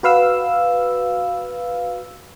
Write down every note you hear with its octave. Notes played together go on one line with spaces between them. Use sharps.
F#4 B4 F5 E6